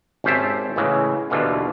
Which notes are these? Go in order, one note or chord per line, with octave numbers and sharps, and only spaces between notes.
G#1 C#4 G4 C5 E5 A5
A2 C#3 E3 G#3
D#2 B2 D3 E3 F4